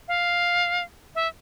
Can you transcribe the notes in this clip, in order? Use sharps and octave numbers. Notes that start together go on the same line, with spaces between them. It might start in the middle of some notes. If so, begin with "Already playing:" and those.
F5
E5